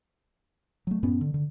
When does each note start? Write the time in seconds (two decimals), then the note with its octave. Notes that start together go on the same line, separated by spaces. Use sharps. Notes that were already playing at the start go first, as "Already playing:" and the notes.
0.87 F#3 A3
1.03 F#2 A2 B3 C#4
1.21 D3
1.34 D3